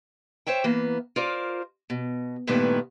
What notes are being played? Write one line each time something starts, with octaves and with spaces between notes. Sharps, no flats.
C5 C#5 E5 G5
E3 A#3 B3
F4 A#4 C5 D5
B2
G2 A#2 D#3 A3 B3 E4